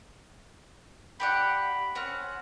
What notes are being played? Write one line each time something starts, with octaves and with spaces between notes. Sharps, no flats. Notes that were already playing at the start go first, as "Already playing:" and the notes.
G4 D5 F#5 B5
C4 C#4 F#5